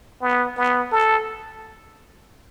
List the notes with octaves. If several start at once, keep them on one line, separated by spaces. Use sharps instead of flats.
B3
B3
A4